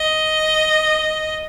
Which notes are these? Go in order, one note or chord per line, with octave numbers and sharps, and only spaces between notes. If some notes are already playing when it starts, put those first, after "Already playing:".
Already playing: D#5